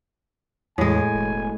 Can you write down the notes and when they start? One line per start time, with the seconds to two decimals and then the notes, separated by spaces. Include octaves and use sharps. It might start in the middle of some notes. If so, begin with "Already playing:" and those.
0.78 E2 A2 G#3 G#5
1.14 E1